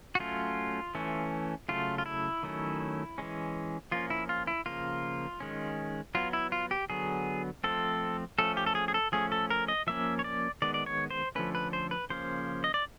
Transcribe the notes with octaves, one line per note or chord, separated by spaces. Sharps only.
F#4
F#3 A3 C#4 F4
E3 A3 C#4
C#3 F#3 A3 F4
F4
E4
D#3 F#3 A3 C#4
E3 G#3 C#4
F3 A#3 C#4 F4
E4
F4
E4
C#3 F3 A#3 F4
D#3 G#3 C#4
F#3 B3 F4
E4
F4
G4
D3 F#3 B3 G#4
F3 A3 C4 A4
F3 A3 C#4 A4
G4
A4
G#4
G#4
A4
F3 A3 C#4 G#4
A4
A#4
D#5
F3 A#3 C#4 E5
C#5
D5
D#3 G#3 B3 D5
D5
C#5
C5
D3 F3 A3 C#4 B4
B4
C5
B4
C#3 F3 A#3 C#4 C5
D#5
D5